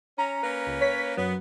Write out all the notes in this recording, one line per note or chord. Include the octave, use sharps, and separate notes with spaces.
C#4 A#5
A#3 C#4 B4
C#2
C#5 B6
F#2 F#3 B3